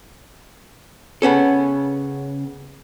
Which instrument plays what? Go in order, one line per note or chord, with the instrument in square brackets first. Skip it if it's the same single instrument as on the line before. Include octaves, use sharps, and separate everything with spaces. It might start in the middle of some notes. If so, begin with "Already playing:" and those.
[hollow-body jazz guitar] C#3 B3 C#4 A4